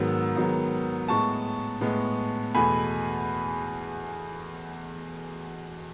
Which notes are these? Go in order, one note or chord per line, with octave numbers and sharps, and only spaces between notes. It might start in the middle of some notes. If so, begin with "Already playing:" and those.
Already playing: G#2 D#3 F#3 B3 E6
G#2 D#3 F#3 B3
A2 G#3 B3 A5 C#6
A2 G#3 B3
E2 B2 A3 G#5 B5